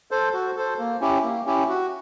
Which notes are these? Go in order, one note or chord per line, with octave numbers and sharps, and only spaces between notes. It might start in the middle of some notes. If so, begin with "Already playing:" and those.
A4 C5
F#4
A4 C5
A#3
C#4 E4 G4
A#3
C#4 E4 G4
F#4